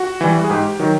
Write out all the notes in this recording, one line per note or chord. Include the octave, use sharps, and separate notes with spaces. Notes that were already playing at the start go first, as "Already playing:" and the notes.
Already playing: F#4
E3 G3
G#4
G#2 G4
D#3 F#3